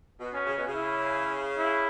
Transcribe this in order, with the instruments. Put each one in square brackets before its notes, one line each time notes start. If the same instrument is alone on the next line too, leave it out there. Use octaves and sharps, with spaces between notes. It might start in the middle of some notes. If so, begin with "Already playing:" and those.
[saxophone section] B2
[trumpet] C#4
[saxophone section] C#3
B2
C#3
[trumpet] E4
E4